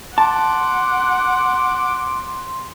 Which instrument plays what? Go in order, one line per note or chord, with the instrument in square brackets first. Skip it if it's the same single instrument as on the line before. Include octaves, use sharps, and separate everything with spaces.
[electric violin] F#5 [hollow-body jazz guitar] A5 [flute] C6 [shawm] D6